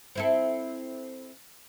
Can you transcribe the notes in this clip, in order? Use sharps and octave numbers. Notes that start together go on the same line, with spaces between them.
C4 E4 A4